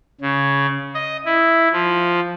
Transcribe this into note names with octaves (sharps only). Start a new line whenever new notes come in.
C#3
D#5
E4
F3